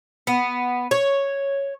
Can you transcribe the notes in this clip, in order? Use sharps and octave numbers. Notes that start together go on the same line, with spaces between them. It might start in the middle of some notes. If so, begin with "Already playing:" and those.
B3
C#5